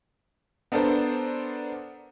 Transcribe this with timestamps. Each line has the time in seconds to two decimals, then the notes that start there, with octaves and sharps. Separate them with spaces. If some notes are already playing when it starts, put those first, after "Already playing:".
0.72 B3 D4 A4 A#4 C5